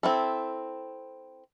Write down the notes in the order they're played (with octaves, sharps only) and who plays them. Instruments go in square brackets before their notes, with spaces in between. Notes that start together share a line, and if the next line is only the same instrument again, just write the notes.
[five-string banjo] C4 E4 A4